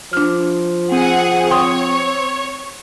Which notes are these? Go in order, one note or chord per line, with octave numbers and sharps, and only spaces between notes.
F3 D4 F6
C4 G#4 F#5
C#5 G5 C6 D#6